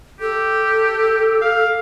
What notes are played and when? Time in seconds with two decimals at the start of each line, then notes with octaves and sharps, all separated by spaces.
0.21 G4 A4
1.42 F5